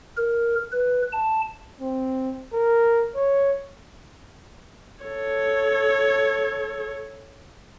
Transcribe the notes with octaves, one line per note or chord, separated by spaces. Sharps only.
A#4
B4
A5
C4
A#4
C#5
A4 C#5